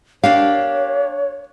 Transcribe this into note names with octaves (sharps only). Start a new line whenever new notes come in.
A#3 D4 G4 C#5 F5